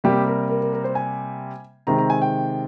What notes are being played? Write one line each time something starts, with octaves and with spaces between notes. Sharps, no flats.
C3 G3 A#3 G4
A#4
A#4
A#4
A#4
C5
G#5
C3 D#3 G#3 C4 A#5
A#5
G#5
G5